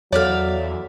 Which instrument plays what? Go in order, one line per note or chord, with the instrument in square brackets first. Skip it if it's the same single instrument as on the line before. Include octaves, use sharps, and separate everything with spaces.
[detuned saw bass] E2 [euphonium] F#3 [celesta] A4 C#5 [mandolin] D5 E5 F5